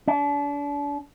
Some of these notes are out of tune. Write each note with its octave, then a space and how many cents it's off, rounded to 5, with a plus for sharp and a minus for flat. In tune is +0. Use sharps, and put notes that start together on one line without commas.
D4 -35